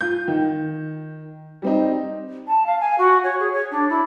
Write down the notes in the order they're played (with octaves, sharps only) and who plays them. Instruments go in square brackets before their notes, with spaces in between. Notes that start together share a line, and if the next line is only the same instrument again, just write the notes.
[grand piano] F4 G6
D#3
G3 C4 D#4
[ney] A5
F5
G#5
F#4
C#5
G#4
C#5
D4
E4